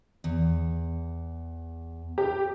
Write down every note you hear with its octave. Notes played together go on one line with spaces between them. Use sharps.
E2
G4